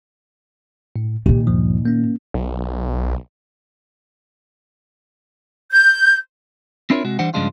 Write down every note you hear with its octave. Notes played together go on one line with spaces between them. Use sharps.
A2
A#2 D#3 G4
D2 G2 F3
A#3 C#4
B1
G6
C4 D4 E4 F4 A#4 C#5
C3 G#3 F#4
E3 G3 D4 C5 F#5
G2 C#3 F3 G#3 D4 F4